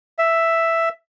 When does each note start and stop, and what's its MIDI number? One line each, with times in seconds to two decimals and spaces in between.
0.19 0.89 76